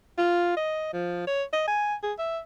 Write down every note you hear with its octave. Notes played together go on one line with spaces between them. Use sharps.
F4
D#5
F3
C#5
D#5
G#5
G#4
E5